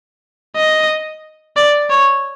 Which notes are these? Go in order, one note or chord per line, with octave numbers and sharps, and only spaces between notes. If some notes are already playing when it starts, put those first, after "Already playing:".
D#5
D5
C#5